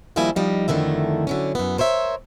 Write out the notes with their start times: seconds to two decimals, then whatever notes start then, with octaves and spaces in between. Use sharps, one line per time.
0.16 D#3 F3 G3 A#3 E4 G#5
0.36 F3 G3 D#4
0.68 F2 D3 D#3 A3 E4
1.27 D3 F#3 C#4
1.55 F#2 B3
1.78 A#4 C5 C#5 E5